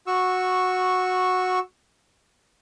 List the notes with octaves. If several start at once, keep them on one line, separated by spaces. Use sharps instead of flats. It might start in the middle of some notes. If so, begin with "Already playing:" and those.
F#4 C#6 E6